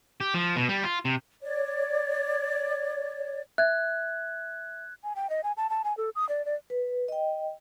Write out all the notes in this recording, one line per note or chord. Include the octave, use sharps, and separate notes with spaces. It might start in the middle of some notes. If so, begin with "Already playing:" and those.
G4
F3
B2
G3
F4
C3
C#5 D5
E5 F#6 G#6
G#5
G5
D#5
G#5
A5
A5
G#5
A4
D#6
D5
D5
B4
D#5 G5